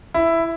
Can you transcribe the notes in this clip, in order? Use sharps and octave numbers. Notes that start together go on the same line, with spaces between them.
E4